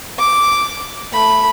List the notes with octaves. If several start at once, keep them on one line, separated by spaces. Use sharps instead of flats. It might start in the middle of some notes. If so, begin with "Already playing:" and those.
D6
A3 B5